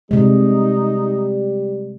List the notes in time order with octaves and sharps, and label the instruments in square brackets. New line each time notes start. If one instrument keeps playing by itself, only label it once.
[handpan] C3 G#3 [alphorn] G3 [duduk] D#4